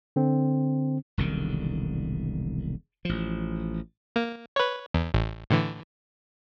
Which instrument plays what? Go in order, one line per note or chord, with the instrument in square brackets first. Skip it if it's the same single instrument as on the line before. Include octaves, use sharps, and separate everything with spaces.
[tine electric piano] D3 C4
[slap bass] E1 C2 D3 D#3
A1 F3
[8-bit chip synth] A#3
B4 C#5
E2
A1
A2 D3 E3